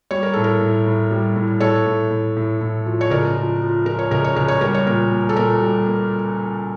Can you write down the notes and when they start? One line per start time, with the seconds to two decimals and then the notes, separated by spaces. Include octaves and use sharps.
0.11 G3 C#5
0.23 A#4
0.33 A2 A4
0.44 A#4
0.61 A2
0.86 A2
1.11 G3
1.36 A2
1.60 A2 A4 C#5
1.86 A2
2.10 A2
2.37 A2
2.61 A2
2.86 F3
3.01 C#5
3.10 C#2 A#4 D5
3.36 F3
3.61 F3
3.86 F3 A#4
3.99 C#5
4.11 C#2 A#4
4.24 C#5
4.36 C#2 A#4
4.48 C#5
4.61 G3 A#4
4.74 C#5
4.87 A#2 A#4
5.11 A#3
5.29 A4
5.36 A#2 A#4
5.61 G3
5.86 A#3